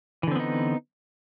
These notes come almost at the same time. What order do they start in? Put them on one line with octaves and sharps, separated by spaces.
E3 D3 C4 B3 D#4